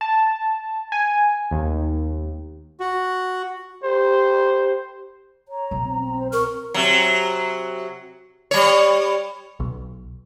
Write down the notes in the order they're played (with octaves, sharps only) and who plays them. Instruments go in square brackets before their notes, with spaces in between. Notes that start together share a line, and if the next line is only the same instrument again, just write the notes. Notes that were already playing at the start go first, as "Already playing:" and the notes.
[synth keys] A5
G#5
D#2
[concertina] F#4
[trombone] G4 [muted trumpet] C5
[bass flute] C#5 [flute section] A#5
[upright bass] B1
[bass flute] C4
C4
[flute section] C5
[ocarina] A#4 [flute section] C#6 F6
[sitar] C3 F#3
G3 C#5
[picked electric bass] B1